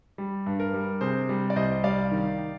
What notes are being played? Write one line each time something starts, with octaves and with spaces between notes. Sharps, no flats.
G3
G2
A#4
G3
C3 G#4 C5
G3
D5
C2 C5 D#5
G3 D5 F5
D#3